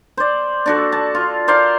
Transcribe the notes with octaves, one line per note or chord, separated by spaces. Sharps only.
C5 D5
D4 F#4 A4
A5
F4
A#4 C5 D5 F5